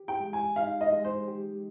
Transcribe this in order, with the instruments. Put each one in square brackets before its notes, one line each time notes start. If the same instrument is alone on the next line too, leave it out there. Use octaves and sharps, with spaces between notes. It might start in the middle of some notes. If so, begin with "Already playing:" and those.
Already playing: [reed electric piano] G4
[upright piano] G5
[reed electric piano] G#3
[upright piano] G#5
[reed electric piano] D#4 [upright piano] F5
[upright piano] D#5
[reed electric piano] G#3
[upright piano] C5
[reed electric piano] G4